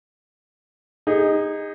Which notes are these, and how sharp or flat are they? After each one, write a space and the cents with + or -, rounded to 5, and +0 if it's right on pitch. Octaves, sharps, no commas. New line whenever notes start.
D#4 +0 G#4 -35